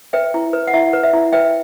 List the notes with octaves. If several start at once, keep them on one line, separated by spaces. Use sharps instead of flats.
B4 E5 G5
E4
B4
F#5
E4 E5
B4
E5
E4
B4 E5 G5